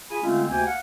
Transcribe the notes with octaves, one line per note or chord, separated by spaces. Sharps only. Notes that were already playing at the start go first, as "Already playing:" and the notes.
F4 G#4 G#5 B5
D3 G#3 A3 C4 C#4 F4
D2 C3 A#3 G5 G#5
F5 F#5